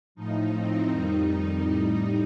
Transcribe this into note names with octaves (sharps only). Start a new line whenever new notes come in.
A2 F3 D#4
C4
F2 D#3 G3 D#4
A2 G3